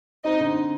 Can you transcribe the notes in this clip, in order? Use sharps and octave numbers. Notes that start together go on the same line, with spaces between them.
C4 D#4 D#5
D3